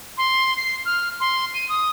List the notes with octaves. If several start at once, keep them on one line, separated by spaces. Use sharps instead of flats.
C6
C7
F6
C6
D#7
D#6